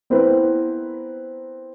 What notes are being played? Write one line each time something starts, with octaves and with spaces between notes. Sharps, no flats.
B3 C4 E4 A#4 B4